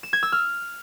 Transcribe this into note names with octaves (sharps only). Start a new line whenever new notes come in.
E7
G#6
E6
F6